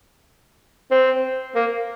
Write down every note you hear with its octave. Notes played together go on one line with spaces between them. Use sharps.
C4
A#3